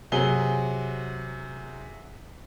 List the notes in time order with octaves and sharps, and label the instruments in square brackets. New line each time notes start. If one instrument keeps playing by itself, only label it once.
[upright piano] C3 F#3 G#4 G7